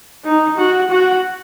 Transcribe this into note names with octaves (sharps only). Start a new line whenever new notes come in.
D#4
F#4
F#4